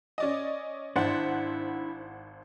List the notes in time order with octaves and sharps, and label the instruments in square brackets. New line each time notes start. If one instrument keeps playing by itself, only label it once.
[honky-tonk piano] C#4 D5 D#5
[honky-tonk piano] G#1 C5 F#5 [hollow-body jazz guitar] D4 E4